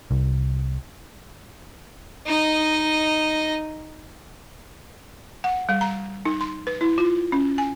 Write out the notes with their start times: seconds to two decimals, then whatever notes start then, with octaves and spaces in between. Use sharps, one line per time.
0.11 C2
2.26 D#4 D#5
5.44 F#5
5.69 G3
5.81 A#5
6.25 D#4
6.41 C6
6.67 B4
6.81 E4
6.98 F4
7.32 C#4
7.58 G#5